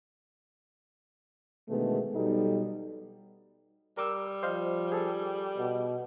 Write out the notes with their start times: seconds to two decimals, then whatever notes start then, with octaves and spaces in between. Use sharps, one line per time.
1.69 B2 D3 D#3 G#3 A3 B3
2.14 B2 F#3 G3 D#4 A4
3.97 G3 A#4 D6 E6
4.43 F3 C5 D#5 F5
4.92 G#4 A4
5.58 B2